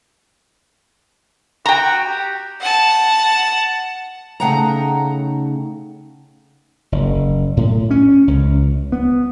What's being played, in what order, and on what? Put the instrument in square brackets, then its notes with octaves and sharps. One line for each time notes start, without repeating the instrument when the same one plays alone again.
[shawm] F#4 [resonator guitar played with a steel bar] G5 A#5
[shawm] G4
[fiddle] F#5 A5
[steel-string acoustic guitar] C#3 A3 D#4 F#5 G5 A#5
[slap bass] F#1
A2
C#4
C#2
B3